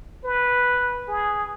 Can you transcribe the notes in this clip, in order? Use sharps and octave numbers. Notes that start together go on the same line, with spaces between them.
B4
G#4